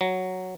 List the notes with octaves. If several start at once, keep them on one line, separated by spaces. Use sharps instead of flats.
F#3